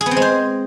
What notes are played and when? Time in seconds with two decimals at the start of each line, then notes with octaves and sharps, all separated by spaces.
0.01 G#4
0.06 B3
0.11 C4
0.17 G#3
0.22 C5